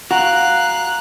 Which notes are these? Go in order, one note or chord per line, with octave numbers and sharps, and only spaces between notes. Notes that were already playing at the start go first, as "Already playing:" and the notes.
F#4 F5 G#5 A#5 F#6 F7